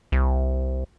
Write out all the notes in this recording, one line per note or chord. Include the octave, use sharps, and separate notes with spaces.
C2